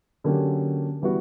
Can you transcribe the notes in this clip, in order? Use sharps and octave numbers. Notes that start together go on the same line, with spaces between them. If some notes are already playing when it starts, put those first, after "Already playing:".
D3 F#3 A#3 C#4 G4
E3 G3 B3 F#4